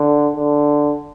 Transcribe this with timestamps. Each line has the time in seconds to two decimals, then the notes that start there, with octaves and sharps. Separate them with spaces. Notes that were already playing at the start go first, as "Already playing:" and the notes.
Already playing: D3
0.36 D3